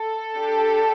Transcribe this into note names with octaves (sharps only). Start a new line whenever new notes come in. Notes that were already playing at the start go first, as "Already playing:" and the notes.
Already playing: A4
D4 G4